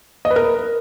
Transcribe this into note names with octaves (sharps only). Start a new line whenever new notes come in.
D#5
B4
A#4